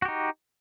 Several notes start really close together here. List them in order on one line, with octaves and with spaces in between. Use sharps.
F#4 G4 D#4